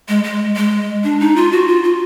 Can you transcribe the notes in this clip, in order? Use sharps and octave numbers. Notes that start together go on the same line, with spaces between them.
G#3
G#3
G#3
D4
D#4
F4
F#4
F4
F4